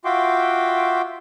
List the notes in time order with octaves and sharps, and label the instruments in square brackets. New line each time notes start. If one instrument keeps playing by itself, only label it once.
[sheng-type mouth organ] F4 F#4 E5 G5 C6 D6